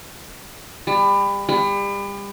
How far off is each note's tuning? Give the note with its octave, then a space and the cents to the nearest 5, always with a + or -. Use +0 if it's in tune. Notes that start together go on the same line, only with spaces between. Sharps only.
G3 +30
G3 +35